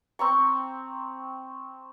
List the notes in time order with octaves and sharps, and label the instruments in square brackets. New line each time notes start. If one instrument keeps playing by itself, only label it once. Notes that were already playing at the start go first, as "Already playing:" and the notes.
[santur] C4 A#5 C#6